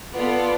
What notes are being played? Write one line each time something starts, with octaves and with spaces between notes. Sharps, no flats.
B3 F4 A4 D5